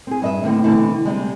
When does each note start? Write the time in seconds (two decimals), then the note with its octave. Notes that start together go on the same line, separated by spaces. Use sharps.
0.07 C4 G#4
0.22 G2 D#5 E5
0.43 D#2 A2 D3 B3 C4
0.63 B2 D3 E3 A3 B3 C4
1.05 C3 G3 G#3